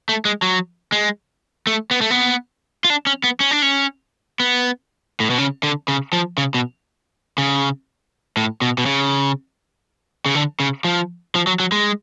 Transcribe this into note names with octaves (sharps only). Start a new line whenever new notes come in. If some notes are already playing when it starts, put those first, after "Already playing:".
A3
G#3
F#3
G#3
A3
B3
A3
B3
F4
D4
C#4
B3
C#4
D4
C#4
B3
A2
B2
C#3
D3
C#3
F3
C#3
B2
C#3
A2
B2
B2
C#3
C#3
D3
C#3
F3
F3
F#3
F#3
G#3